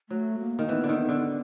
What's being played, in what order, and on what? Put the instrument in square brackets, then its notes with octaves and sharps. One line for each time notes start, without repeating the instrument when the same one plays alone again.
[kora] F#3 [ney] A3
[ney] A#3
[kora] D#3
[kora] E3 [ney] B3
[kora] D3
D#3
D3